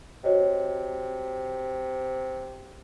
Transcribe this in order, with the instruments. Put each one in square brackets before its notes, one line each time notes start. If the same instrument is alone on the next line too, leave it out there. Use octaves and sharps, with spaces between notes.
[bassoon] C3 [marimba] F#4 C#5 D#5